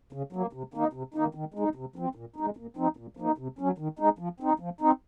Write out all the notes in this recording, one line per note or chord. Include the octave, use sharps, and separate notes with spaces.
C#3
F#3 A#3
C3
D#3 A#3 D#4
C3
D#3 A#3 D#4
D#3
G#3
D#4
C3
F3 C4
A#2
G#3 D#4
A#2
F3 C4 D#4
A#2
F3 A#3 D#4
C3
F#3 C#4
D#3
G#3 D#4
F3
C4 D#4
F3
C4 D#4